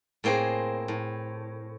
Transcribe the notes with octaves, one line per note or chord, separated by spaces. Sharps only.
A2 A#3 C4 G#4 C5
A2